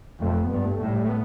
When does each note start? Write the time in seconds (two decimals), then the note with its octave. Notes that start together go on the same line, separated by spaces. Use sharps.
0.21 F2 A3
0.44 B3
0.51 G2
0.65 A3
0.81 A2
0.88 G3
1.04 A3
1.09 B3